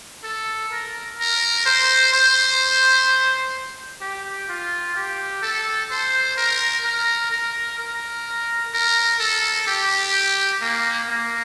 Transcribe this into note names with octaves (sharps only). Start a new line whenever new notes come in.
A4
A#4
A#4
C5
C5
G4
F4
G4
A4
C5
A#4
A#4
A#4
A#4
A#4
A4
G4
A#3
A#3